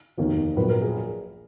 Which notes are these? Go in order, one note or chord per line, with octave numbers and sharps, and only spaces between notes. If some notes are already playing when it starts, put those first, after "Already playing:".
F1 D#2 D#3 A#3
A#1 A#2 F#3 A#3 B4
A#4
G#4